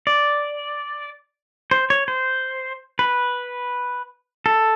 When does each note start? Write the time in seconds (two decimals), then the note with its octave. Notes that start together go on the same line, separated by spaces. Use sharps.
0.07 D5
1.71 C5
1.90 C#5
2.08 C5
2.99 B4
4.46 A4